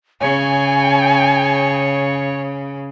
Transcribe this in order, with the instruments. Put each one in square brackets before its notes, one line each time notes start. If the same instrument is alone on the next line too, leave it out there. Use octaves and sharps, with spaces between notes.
[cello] C#3 [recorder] C#5 [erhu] G#5